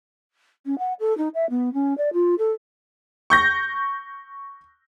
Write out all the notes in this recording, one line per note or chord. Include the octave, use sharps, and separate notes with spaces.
C#4
F#5
A4
D#4
E5
B3
C#4
D5
F4
A4
C#6 G6 A#6